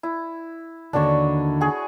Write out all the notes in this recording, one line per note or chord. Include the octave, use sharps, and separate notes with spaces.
E4
D#2 D3 D4 F#4 C#5
F#4 G#4